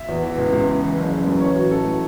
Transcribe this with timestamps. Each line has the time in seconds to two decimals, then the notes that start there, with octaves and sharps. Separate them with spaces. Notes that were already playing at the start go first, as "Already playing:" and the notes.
Already playing: E5
0.09 E2
0.23 E3
0.38 C#2
0.52 C#2
0.67 C#3
0.82 E3
0.97 F#1
1.12 F#1
1.27 F#2
1.41 E3 C#5
1.56 A1 F#4
1.71 A1 A4
1.85 A2